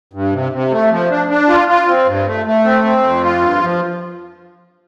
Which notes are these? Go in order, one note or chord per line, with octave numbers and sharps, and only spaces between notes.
G2
C3
C3
A3
F3
D4
D4
F4
F4
C4
G2
A3
A3
C4
C4
F2
F4
G2
F3